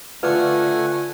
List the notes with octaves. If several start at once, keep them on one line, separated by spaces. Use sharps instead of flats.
D3 A3 F4 B4 D5 F#5 G#5 D6